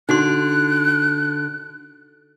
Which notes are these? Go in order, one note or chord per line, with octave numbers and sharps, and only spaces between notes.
D3 D#4 F#4 C6 F#6